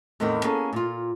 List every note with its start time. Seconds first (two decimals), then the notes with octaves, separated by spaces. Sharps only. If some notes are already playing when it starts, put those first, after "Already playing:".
0.20 E2 A2 D#3 E3 B3 C4
0.44 A#3 B3 C#4 G#4 A4
0.73 A#2 F4